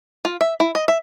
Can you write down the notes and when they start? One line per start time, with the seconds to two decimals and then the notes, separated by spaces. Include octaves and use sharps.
0.25 F4
0.41 E5
0.60 E4
0.75 D#5
0.88 E5